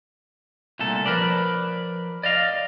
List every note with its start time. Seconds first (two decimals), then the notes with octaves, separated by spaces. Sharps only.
0.79 C2 A#2 D3 A3 A4
1.06 F3 A#4 B4 D5
2.23 D5 D#5 F5